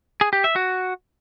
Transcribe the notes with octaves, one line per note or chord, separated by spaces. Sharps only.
G#4
G4
E5
F#4